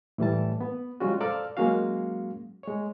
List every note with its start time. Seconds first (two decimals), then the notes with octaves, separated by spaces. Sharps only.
0.18 A2 E3 G3 A5
0.61 B3
1.00 F3 G3 G#3 C#4 F4 F#4
1.21 A4 C5 D5 F5 A#5 F6
1.57 F#3 G#3 A#3 C#4 F#4 F5
2.63 G#3 C#5